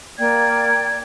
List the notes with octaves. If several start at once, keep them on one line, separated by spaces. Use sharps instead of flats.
A#3 D5 G5 G#6